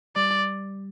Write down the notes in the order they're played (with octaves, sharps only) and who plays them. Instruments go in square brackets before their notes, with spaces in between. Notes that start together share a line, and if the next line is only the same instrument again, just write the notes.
[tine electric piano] G3 [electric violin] D5